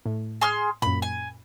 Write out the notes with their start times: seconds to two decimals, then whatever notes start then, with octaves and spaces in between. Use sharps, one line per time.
0.06 A2
0.41 G#4 C6 F6
0.82 F#2 A#2 B5
1.02 G#5